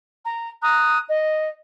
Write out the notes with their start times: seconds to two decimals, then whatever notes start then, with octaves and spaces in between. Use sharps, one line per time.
0.24 A#5
0.61 A#5 D#6 F#6
1.08 D#5